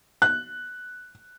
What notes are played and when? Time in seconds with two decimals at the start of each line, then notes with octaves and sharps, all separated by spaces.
0.22 F#6